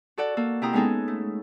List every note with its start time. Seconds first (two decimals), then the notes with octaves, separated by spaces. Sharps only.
0.18 F#4 A4 D5 F#5
0.37 A#3 A4
0.62 C3 E4 G5 A#5 D#6
0.73 G#3 B3 C#4 D#4 G#4 A4
1.08 A3